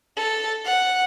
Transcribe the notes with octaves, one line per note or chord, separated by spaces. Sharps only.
A4
F#5